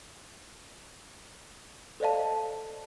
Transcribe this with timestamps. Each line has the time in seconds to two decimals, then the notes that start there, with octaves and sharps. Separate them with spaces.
2.00 A4 C5 D5 D#5 F5 A5